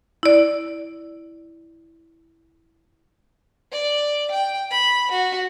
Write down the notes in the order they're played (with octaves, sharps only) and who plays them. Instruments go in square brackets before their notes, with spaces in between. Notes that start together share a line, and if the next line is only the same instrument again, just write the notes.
[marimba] E4 D5
[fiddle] D5
G5
B5
F#4